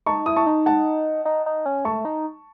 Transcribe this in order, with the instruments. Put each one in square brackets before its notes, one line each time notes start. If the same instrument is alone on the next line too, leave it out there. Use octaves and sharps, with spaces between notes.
[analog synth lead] D#4 [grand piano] A5 C#6
[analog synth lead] E4 [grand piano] D#6
[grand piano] A5 C#6
[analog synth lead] D#4
[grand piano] F#5 A5
[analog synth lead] D#4
D#4
C#4
[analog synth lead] A3 [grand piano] A5 C#6
[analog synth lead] D#4